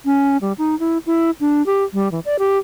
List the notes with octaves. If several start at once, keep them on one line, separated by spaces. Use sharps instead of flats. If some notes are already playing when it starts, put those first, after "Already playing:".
C#4
G3
D#4
E4
E4
D4
G4
G3
E3
D5
G4